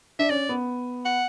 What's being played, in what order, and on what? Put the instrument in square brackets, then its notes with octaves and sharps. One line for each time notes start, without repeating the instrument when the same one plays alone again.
[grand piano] D4 [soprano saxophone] E5
[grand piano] C#4 [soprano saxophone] D5
[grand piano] B3
[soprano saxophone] F#5